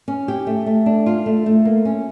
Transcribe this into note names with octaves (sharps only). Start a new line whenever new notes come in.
C#4
G4
A3
A3
D4
F4
A3
A3
A#3
C#4